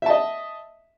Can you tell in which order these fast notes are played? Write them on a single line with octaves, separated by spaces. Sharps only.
E5 A5 D#5